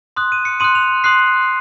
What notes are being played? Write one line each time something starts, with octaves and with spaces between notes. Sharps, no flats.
C6 D#6 F#6
D#7
C#7
C6 D#6 F#6 D#7
F7
C6 D#6 F#6 C7